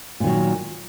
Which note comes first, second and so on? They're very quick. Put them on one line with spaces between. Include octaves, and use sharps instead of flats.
A#2 D#3 F#3